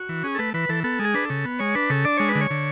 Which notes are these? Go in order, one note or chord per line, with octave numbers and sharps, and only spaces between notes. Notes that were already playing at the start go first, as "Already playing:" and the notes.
Already playing: F#4
E3
C#4 G#4
A4
A3 B4
E3 B4
E3 A4
B3 A4
G#3 G#4
D4 B4
A4
C#3
B3
G#3 C#5
D4 B4
C#3 A4
D4 D5
G#3 C#5
B4
D3
C#5
D3